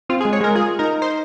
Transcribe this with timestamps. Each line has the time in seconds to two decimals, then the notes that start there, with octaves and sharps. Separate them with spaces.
0.09 C4 F4
0.20 G#4
0.25 G#3
0.33 C#5
0.41 G#3 A#4
0.55 F4 G#4
0.79 D#4 A#4
1.02 C5